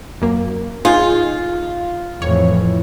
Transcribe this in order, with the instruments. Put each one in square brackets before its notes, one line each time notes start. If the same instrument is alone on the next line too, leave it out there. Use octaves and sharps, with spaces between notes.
[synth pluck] F#2 A#3
[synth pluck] D#4 G#4 [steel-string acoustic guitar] F4
[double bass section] F2 A2 E3 [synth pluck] C#5